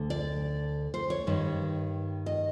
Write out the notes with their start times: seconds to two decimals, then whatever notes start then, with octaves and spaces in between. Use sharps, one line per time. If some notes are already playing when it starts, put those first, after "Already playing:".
Already playing: D2 D3
0.10 D5
0.94 C5
1.10 C#5
1.27 G2 D#3
2.26 D#5